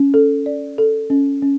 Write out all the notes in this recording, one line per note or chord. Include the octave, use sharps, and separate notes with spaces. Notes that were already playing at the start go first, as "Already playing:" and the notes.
Already playing: C#4
A4
D5
A4
C#4
C#4